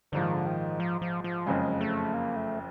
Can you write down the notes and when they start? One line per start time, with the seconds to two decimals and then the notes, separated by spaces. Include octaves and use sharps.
0.12 A#1 G#2 D3 F3
0.23 D#3
0.34 D3
0.46 D#3
0.80 F3
1.02 F3
1.24 F3
1.46 F#1 F2 C#3 G#3
1.81 A3
2.14 A#3
2.36 A3